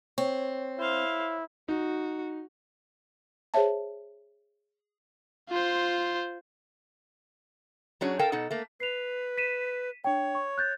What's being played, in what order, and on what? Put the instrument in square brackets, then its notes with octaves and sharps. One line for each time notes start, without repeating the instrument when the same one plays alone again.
[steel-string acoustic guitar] C4 [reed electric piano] C#5
[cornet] E4 [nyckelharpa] C5 F5
[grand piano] D#4 [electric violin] F#4
[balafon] G#4 C5 C#5 E5 A5
[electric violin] F4 C5
[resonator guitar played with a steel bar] F#3 C#4 D4 F#4 G#4 C#5
A4 A#4 F5 G5 A5
B2 D#4 A4 F#5
A3 A#3
[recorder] B4 [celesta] C7 F7
[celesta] B6 D#7 E7
[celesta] D4 G5 [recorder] C#5
[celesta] C#6
F#6 G6 A6